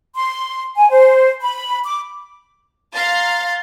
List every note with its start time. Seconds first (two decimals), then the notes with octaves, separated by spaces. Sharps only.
0.16 C6
0.76 G#5
0.90 C5
1.42 B5
1.85 D6
2.94 F5 A#5 C6 A6